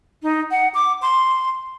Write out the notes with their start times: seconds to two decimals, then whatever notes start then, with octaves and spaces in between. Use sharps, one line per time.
0.23 D#4
0.51 F#5
0.74 D6
1.02 C6